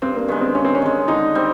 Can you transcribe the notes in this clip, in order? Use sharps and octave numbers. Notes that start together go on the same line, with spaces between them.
G2 C4
A#3
D#3 G#3 B3
C4
G2 C#4
C4
C#4
D#3 G#3
D3 D#4
G3 C4